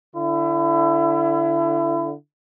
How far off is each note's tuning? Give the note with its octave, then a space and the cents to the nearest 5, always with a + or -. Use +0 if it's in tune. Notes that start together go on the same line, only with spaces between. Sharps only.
D3 +0 E4 +30